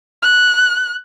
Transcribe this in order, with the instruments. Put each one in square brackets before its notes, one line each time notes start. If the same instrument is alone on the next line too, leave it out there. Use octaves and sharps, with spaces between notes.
[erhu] F#6